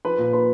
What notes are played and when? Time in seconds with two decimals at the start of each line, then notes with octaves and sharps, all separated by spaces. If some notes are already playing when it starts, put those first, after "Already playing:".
0.05 F3 B4
0.18 A#2
0.32 A#3 B4